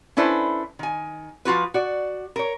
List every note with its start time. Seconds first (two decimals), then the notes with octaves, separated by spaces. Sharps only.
0.17 C#4 D4 E4 A4 B4 C5
0.79 D#3 G#5
1.45 F3 F4 F#4 B4
1.74 F#4 D5
2.36 A#4 C#5